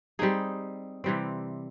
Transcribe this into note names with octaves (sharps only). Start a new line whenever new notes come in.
G3 C4 D#4 G#4
C3 E3 G3 C4